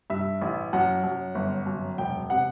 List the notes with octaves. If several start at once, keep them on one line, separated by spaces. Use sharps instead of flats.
G2 E5
A1
F#2 F#5
F#2
G1
F#2
E1 G5
C3 F#5